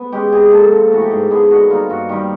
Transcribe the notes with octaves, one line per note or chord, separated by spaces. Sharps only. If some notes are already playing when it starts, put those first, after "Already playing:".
Already playing: B3
G#3 C#4 G4
C3 G#4
F3 A#3 A4
C3
E3 A3 F#4
G4
G#2 G#4
F3 G#3 B3 G#4
D3 F#4
G3 A#3 D#4 F4
G2 F#4
D#3 G3 A#3 G4